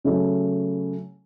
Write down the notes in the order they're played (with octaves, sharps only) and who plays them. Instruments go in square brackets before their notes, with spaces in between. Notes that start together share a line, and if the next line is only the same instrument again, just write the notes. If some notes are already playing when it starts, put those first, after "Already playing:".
[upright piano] C#3 F#3 A3